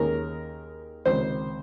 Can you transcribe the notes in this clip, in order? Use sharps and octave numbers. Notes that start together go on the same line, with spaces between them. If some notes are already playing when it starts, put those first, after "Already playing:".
Already playing: D#2 D#3 G#3 C#4 A#4
C#2 C3 D#3 C5